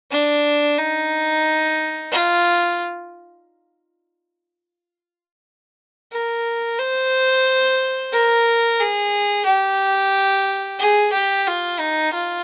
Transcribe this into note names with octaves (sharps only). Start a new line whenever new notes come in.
D4
D#4
F4
A#4
C5
A#4
G#4
G4
G#4
G4
F4
D#4
F4